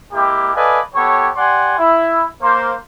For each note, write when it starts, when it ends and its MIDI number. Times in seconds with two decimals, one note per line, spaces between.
0.12 0.51 56
0.12 0.51 58
0.12 0.51 64
0.12 0.51 67
0.55 0.79 69
0.55 0.79 71
0.55 0.79 74
0.55 0.79 75
0.55 0.79 77
0.55 0.79 80
0.94 1.28 59
0.94 1.28 67
0.94 1.28 69
0.94 1.28 73
1.35 1.76 67
1.35 1.76 74
1.35 1.76 78
1.35 1.76 80
1.35 1.76 84
1.78 2.24 64
2.41 2.74 58
2.41 2.74 72